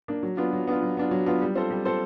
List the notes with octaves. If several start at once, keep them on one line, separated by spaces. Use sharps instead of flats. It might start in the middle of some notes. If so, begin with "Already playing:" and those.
A#3 D4
F#3
B3 D4 F4
F#3
B3 D4 F4
F#3
B3 D4 F4
F#3
B3 D4 F4
G3
C4 F4 A4 C5
G3
C4 F4 A4 C5